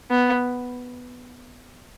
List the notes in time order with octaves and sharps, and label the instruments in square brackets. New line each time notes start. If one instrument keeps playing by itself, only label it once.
[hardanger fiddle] B3